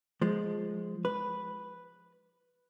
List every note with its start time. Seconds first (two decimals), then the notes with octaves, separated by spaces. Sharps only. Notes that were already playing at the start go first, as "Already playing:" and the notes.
0.21 F3 G#3
1.05 B4